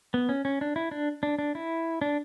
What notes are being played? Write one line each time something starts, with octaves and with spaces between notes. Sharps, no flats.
B3
C#4
C#4
D4
E4
D4
D4
D4
E4
D4